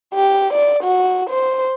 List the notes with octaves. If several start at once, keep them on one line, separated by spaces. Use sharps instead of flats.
G4
D5
F#4
C5